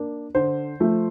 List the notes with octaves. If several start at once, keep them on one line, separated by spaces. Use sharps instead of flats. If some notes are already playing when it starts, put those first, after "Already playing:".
Already playing: A#3 D4
D3 C5
F3 A3